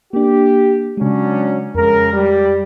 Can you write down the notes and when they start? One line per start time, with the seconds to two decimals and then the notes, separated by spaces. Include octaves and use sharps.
0.13 A#3 D4 G4
0.97 C#3 F#3 G#3 C#4 D4
1.75 F2 C#3 G#3 A#4
2.13 G3